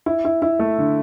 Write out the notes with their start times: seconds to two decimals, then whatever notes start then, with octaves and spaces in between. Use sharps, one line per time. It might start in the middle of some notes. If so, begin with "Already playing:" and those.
0.06 E4
0.25 E4
0.42 E4
0.59 A3
0.78 D3